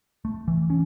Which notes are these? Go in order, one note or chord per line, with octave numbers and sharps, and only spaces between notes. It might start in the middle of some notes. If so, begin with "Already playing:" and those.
A3
E3
C#4